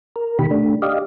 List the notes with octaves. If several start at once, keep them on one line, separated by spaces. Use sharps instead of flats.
A#4
B2 D#3 G4 B5
A3 D4
G4 D5 D#5 F5